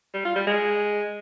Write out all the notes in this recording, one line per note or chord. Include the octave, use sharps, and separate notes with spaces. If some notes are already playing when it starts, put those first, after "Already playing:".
G3
F4
G3
G#3